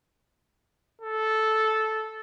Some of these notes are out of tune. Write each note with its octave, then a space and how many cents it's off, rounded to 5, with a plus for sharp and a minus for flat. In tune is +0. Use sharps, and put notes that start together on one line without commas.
A4 -10